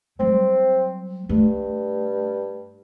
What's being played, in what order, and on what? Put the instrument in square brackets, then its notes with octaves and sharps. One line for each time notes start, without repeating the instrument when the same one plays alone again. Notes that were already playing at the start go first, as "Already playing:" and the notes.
[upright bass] F#3 G3 [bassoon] C4
[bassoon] G2 [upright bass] A3